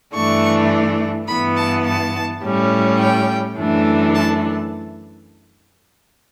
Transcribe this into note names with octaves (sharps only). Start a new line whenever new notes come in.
G2 E3 A3 D4 C#6
G2 E3 B3 B5
A5
A5
A2 G3 C#4
G5
F#2 E3 A3 D4
A5